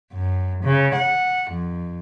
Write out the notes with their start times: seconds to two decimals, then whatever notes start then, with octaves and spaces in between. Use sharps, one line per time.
0.13 F#2
0.64 C#3
0.95 F#5
1.51 F2